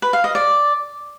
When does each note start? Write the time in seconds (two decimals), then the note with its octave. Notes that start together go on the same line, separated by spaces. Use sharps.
0.02 B4
0.13 F5
0.24 D#5
0.35 D5